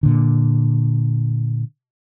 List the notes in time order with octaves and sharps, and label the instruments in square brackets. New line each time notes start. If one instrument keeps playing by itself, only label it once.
[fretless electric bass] A#2 D3